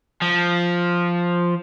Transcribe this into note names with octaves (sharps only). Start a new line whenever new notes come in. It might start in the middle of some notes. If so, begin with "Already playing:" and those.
F3